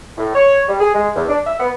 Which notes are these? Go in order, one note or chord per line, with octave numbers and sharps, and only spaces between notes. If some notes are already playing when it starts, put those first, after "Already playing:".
A2
C#5
G3
G#4
G#3
E2
D4
E5
B3